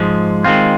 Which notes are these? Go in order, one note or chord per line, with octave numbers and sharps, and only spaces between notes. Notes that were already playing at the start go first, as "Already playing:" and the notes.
Already playing: G#2 F3 G#3
D#3 G#3 C4 F4